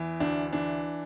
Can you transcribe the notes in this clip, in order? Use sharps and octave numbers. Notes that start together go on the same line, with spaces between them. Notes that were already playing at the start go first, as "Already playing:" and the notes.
Already playing: E2 E3
D2 D4
E3 D4